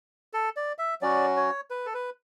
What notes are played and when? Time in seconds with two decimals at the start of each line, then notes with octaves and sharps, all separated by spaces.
0.33 A4
0.56 D5
0.78 E5
1.01 F#3 C#4 F#4 D5
1.37 C#5
1.70 B4
1.86 A4
1.94 B4